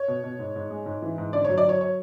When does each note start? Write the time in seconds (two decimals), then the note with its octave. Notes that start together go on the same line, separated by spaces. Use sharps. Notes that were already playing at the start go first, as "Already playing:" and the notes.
Already playing: C#5
0.08 B2
0.24 B2
0.39 G#2
0.56 G#2
0.71 G#3
0.86 G#2
1.02 E3
1.18 G#2
1.33 D3 D5
1.45 C#5
1.49 F#3
1.58 D5
1.65 F#3 C#5
1.81 C#5